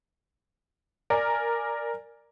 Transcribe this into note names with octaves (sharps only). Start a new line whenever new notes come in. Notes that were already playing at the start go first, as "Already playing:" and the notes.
A#4 D5 G#5